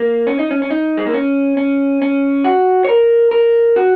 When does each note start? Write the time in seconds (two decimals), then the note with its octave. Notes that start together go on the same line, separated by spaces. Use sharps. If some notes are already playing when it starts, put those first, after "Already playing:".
Already playing: A#3
0.27 C#4
0.39 D#4
0.51 C#4
0.62 C#4
0.71 D#4
0.97 G#3
1.06 A#3
1.14 C#4
1.57 C#4
2.02 C#4
2.44 F#4
2.84 C#5
2.89 A#4
3.31 A#4
3.76 F#4